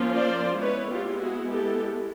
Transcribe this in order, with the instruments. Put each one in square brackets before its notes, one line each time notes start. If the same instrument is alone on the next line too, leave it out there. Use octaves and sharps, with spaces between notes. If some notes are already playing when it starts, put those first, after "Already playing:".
Already playing: [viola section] F3 A#3 C#4 F4
C5 D5
G#3 B3 E4 B4 C#5
F4 G4
F#4 G#4
G4 A4